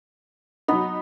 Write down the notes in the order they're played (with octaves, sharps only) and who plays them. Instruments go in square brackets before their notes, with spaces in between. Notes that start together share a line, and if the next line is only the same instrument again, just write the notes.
[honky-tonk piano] F#3 D#4 [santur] B3